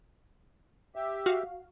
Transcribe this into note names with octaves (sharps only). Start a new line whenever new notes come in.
G4 E5
F#4 F5